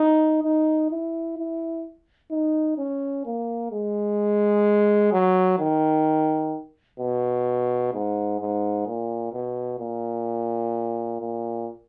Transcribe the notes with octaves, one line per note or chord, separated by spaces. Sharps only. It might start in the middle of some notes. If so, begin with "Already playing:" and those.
Already playing: D#4
D#4
E4
E4
D#4
C#4
A#3
G#3
F#3
D#3
B2
G#2
G#2
A#2
B2
A#2
A#2